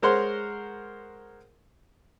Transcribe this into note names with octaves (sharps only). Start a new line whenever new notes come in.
G#3 A#4 C5 C#5 F#5 C6